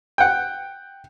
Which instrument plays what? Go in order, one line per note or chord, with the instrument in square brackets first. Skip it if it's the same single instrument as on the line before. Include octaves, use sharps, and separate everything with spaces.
[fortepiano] F#5 G5